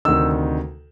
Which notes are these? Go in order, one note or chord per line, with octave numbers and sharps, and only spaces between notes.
D2 C3 D#3 E6